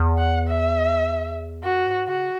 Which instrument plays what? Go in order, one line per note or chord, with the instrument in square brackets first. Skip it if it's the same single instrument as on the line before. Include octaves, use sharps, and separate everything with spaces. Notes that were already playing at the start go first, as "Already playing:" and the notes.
Already playing: [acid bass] E2
[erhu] F#5
E5
[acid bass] F#2 [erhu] F#4
[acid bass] G#2
[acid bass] C#3 [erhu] F#4